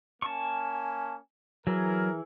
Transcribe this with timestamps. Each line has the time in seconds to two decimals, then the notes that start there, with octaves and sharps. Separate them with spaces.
0.22 A#3 C#4 G#5 A5 C#6
1.67 E3 F#3 G#4 A#4